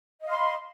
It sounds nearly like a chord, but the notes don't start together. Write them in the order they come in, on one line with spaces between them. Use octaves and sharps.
D#5 F5 C6 B5